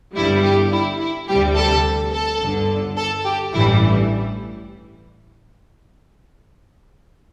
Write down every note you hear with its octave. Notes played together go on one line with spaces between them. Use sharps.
G1 G2 G3 E4
G4
E4
E4
D2 C3 G3 G4
A4
A4
G1 G2 D3
A4
G4
A1 G2 E3 G3 E4